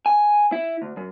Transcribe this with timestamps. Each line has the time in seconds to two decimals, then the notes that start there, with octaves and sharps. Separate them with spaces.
0.06 G#5
0.52 E4
0.82 D2
0.97 F#2